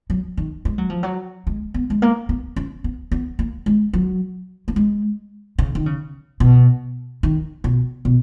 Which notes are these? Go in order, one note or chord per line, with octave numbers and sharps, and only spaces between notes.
F#3
D#3
G#3
F#3
F3
F#3
G#3
B3
G#3
A#3
B3
C#4
B3
B3
A#3
G#3
F#3
A#3
G#3
C#3
D#3
C#3
B2
D#3
B2
B2